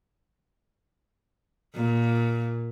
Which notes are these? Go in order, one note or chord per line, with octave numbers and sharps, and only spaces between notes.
A#2